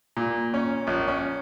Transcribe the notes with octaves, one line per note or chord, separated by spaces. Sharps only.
A#2
C#4
A#1
C#4